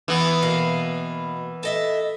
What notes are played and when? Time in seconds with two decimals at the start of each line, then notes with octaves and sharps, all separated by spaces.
0.08 E3 B3
0.42 B2 A#3 F5
1.63 A4 D#5 E5